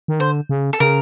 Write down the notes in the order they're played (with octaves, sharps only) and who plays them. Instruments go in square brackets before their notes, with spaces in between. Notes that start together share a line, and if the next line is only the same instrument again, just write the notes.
[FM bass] D#3
[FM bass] D3 [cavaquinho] C5
[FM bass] C#3
[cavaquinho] A4
[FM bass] C#3 [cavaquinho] A#4